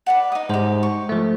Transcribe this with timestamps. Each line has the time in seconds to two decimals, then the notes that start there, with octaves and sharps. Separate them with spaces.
0.06 B4 D5 F#5
0.32 D#4 D#6
0.49 G#2 G#3 G4 C5 A#5
0.83 C#6
1.09 F3 A3